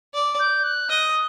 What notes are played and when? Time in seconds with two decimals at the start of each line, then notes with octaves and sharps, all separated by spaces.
0.14 D5
0.40 G6
0.64 F#6
0.89 D#5 D#6